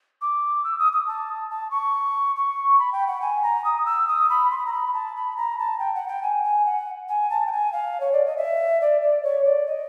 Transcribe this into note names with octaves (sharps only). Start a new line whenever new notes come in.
D6
E6
D#6
D#6
A5
A5
C#6
C#6
B5
G5
F#5
G#5
A#5
D#6
E6
D#6
B5
C6
B5
A#5
B5
A5
B5
A#5
A5
G5
F#5
G5
G#5
G#5
F#5
G#5
A5
G5
G#5
F5
C#5
D5
D#5
E5
D5
D5
C#5
D5
D#5